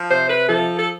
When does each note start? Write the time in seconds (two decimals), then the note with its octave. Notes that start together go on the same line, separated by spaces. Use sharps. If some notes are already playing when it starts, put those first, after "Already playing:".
Already playing: F3
0.08 C3 C5
0.27 B4
0.47 F3 A4
0.77 A4